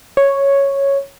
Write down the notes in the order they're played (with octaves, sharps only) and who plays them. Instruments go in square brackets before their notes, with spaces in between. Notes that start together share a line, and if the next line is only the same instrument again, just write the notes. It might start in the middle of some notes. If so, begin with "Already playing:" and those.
[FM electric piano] C#5